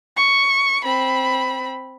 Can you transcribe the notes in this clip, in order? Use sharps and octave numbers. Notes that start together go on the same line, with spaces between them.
C#6
C4 B5